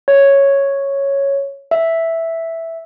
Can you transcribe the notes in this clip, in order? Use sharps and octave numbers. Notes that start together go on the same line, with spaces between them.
C#5
E5